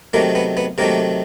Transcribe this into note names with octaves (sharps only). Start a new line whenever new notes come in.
C3 D#3 F#3 A3 A#3
B3
B3
C3 D#3 F#3 A3 A#3